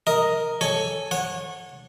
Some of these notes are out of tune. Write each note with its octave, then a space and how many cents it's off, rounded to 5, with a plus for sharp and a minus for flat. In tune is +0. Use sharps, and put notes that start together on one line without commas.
A#4 +0 D#5 +0
A4 +0 C#5 +0 G#5 +0
C#5 -25 F#5 -15